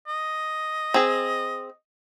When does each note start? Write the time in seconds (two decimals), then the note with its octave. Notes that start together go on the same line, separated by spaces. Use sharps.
0.07 D#5
0.94 C4 G#4